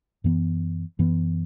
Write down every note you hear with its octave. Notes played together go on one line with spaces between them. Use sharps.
F#2 E3 B3
F#2 E3 B3